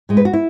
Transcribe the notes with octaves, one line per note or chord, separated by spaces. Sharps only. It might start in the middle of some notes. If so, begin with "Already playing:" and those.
A2 G#3
B4
F#4
E4